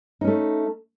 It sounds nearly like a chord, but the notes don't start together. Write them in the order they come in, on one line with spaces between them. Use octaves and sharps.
D#4 C#4 A3